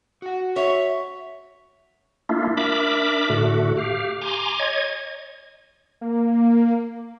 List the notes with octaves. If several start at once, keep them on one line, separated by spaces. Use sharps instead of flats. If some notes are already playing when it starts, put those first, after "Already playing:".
F#4 F#5
C#5 E5
A3 A#3 D4 E4 F4
D4 A#4 E5 B5 D6
A2 D3 A3 F#4
G4 F5
G#5 A#5 C6 D6
C#5 D#5 G#6
A#3